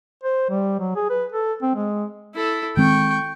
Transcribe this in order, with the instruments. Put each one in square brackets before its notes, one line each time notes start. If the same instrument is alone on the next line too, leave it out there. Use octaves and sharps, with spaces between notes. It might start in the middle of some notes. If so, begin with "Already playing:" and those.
[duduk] C5
G3
F#3
G#4
B4
A4
C4
G#3
[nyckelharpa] E4 A4
[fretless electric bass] D#3 G#3 C4 [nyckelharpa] G5 C#6